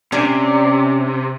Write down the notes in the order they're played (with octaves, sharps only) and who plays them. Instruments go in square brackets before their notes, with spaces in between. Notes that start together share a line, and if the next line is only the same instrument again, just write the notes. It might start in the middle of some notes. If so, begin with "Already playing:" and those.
[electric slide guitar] C3 [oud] C#4 D4 D5